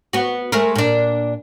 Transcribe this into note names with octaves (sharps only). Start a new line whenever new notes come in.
B3 F#4
G#3 A3 A#4
A#2 D4